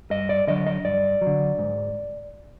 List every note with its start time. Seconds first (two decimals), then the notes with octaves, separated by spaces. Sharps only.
0.11 G2 D#5
0.29 D5
0.47 D3 F#3 D#5
0.67 D#5
0.84 G2 D5
1.21 F#3
1.27 D3
1.59 G#2